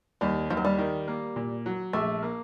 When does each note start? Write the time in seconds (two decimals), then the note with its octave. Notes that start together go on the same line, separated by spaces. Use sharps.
0.21 D#2 G3
0.50 D#2 F3
0.57 F#3
0.65 G3
0.78 D#3
1.08 A#3
1.36 A#2
1.66 F#3
1.93 A#1 A3
2.22 A#3